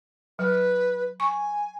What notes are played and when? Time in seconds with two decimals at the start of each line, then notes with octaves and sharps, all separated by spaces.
0.39 F#3 B4
1.20 G#5 C#6